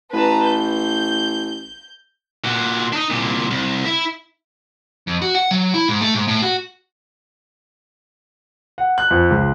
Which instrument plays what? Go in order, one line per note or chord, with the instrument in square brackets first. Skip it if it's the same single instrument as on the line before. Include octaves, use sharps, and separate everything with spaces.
[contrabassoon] A1 [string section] B4 A5 A#5
[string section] G6
[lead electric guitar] A#2 F#4
D4 D#4
C2 A#2
C2
E4
F2
F#4
F#5
F#3
E4
G#2
A3
G#2
A2
F#4
[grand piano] F#5
F#6
F2
C#2